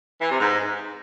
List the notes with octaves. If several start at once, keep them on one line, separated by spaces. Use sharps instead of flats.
E3
C3
G#2